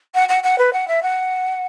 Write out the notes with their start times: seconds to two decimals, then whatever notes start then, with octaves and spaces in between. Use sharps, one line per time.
0.14 F#5
0.29 F#5
0.43 F#5
0.58 B4
0.73 F#5
0.87 E5
1.02 F#5